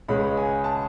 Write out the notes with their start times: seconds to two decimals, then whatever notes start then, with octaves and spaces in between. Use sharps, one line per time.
0.08 C#2 C#3 G#3 C#4 B5
0.37 G#5
0.64 A5